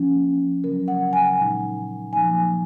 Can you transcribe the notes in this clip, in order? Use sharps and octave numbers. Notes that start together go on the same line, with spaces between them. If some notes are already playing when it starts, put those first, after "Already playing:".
Already playing: F3 A#3 C#4
C#3 F#3 C#4 A#4
F#5
G#5
A#2 G#3 D#4
F3 A#3 D#4 G#5